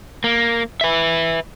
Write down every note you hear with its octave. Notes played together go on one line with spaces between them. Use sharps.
A#3
B4 E5